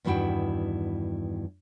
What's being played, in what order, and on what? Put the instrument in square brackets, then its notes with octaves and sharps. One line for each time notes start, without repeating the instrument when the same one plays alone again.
[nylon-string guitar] E2 G2 D#3 E4 F#4 G5